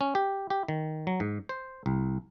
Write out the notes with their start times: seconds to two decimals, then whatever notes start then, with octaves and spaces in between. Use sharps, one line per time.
0.01 C#4
0.15 G4
0.50 G4
0.68 D#3
1.07 F#3
1.20 G#2
1.49 C5
1.86 C2